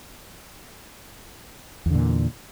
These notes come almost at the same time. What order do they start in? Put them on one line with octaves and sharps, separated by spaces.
E2 D3 A#2